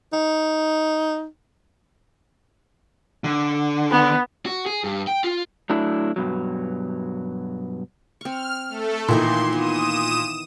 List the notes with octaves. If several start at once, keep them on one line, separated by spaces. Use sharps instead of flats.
D#4
D3
B3
F#4
G#4
G2
G5
F4
F#3 A3 D4 E4
G2 B2 F#3
C4 C#6 F6
A3 A4
A#2 D#3 E3 D#4 C6
B3 D#6 D#7 E7